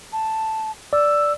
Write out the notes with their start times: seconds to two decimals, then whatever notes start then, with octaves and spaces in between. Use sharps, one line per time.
0.12 A5
0.93 D5 E6